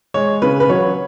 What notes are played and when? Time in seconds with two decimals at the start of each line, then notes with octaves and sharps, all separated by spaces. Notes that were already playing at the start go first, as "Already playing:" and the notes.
0.14 G#3 C#5
0.42 C#3 B4
0.60 B4
0.69 F#3 C#5